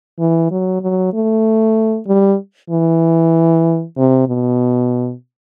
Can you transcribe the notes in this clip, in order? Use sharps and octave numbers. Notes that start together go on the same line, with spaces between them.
E3
F#3
F#3
A3
G3
E3
C3
B2